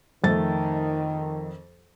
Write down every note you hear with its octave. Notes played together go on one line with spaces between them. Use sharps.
F2 D#3 A3 A6